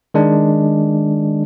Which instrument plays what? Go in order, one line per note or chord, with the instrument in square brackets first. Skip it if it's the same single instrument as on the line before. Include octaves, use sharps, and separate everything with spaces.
[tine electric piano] D#3 G#3 D4